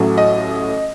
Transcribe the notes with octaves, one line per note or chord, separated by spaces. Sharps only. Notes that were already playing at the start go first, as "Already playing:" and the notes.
Already playing: A1 A2 F#3
D#5